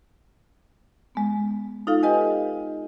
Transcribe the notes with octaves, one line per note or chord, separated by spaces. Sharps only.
G#3 B3
D#4 F4 A4 F5
G4 B4 D#5 G5 G#5